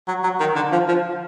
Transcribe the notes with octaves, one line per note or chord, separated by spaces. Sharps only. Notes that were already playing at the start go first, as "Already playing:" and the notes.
F#3
F#3
D#3
D3
F3
F3